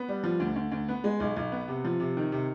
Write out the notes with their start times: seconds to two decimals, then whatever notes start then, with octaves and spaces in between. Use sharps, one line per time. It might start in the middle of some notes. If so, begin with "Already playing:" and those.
Already playing: B3
0.09 G3
0.24 F3
0.40 D2
0.56 D2
0.72 D2
0.89 B3
1.04 G#3
1.20 B1
1.36 B1
1.52 B3
1.68 C3
1.85 F3
2.00 C3
2.17 D#3
2.32 C3